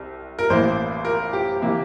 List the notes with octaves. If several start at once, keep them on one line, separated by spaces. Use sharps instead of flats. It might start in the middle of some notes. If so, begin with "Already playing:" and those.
Already playing: C2 C3
A#4
A1 A2 E3 A#3 C5
A#4
G4
C3 E3 A#3